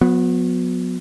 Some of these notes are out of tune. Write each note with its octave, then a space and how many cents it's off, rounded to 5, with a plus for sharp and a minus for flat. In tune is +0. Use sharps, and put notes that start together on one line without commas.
F#3 -40 B3 +0